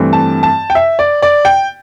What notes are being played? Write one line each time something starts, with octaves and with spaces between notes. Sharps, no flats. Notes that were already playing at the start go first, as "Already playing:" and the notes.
Already playing: G2 E3 A3 C4
A5
A5
G5
E5
D5
D5
G5